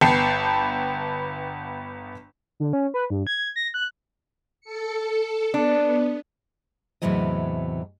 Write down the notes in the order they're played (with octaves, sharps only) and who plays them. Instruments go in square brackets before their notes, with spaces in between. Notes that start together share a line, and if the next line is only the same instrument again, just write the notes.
[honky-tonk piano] G1 B3 G5 A5 C7 C#7
[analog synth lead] D3
C#4
B4
G2
G#6
A#6
F#6
[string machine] A4 C#7
[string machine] B3 [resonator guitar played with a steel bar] D4
[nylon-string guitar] E2 A2 C3 E3 F#3 D#5